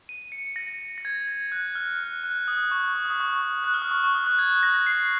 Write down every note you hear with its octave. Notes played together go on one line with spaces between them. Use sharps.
D#7
C#7
A#6
A#6
G#6
G#6
F#6
F6
F#6
F#6
D#6
C#6
D#6
D#6
C#6
F#6
F6
D#6
C#6
C#6
D#6
F#6
G#6
A#6
C7